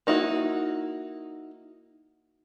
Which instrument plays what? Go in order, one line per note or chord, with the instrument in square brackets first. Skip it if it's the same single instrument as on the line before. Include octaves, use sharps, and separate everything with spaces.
[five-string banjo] A#3 D#4 E4 F#4